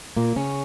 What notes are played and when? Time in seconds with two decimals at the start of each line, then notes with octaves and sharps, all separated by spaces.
0.16 A#2 A#3
0.36 C#3 C#4